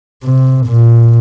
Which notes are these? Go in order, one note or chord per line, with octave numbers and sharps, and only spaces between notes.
C3
A#2